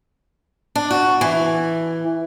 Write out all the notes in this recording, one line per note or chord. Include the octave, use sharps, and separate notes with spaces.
D4
F#4
E3